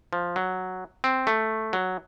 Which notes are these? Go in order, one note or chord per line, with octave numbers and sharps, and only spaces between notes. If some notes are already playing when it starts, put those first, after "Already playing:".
F3
F#3
C4
A3
F#3